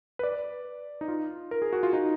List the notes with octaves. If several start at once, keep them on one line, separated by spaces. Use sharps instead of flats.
B4
D5
D#4
F4
A#4
G#4
F#4
F4
D#4